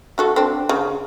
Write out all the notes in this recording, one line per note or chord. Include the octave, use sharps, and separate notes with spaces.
A3 F#4 A4
C4 D4
C#3